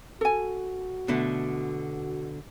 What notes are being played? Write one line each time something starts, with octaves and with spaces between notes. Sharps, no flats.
F#4 A4 G#5
B2 D3 A3